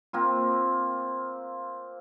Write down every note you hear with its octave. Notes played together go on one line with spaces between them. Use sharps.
A#3 C4 F4